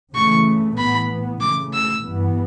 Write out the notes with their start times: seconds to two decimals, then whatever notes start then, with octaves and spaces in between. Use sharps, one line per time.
0.14 C#3 E3 A3 C#6
0.78 A2 E3 B3 B5
1.41 C#3 E3 A3 D6
1.73 E6
2.04 G2 E3 B3